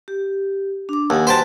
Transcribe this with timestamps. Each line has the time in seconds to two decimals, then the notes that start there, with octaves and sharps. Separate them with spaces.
0.08 G4
0.89 D4 D6
1.10 D#2 F#5 G#5
1.27 F#4 B4 C5 G5 A5